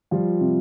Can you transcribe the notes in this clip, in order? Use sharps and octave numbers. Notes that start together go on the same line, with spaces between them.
F3 G3 F4
C3